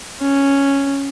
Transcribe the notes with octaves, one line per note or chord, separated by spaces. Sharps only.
C#4